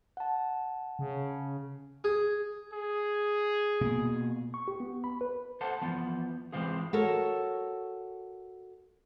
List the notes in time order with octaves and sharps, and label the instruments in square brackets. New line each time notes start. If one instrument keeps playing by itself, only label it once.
[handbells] F#5 A5
[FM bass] C#3
[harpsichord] G#4
[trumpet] G#4
[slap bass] B2 A#3
[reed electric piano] C#6
G4
B3
B5
B4
[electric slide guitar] A4 C5 F#5 A5
E3 F3 B3
E3 F3 G#3 C4 F4 G#4
[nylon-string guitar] F#4 A4 A#4 C#5